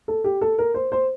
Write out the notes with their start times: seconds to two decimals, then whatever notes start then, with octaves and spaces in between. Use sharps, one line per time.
0.08 A4
0.24 G4
0.41 A4
0.58 A#4
0.74 C5
0.92 C5